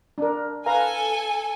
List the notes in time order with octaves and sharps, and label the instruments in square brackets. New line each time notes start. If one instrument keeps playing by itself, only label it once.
[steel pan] D4 A#4
[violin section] A4 G#5 [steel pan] B4 F5 A#5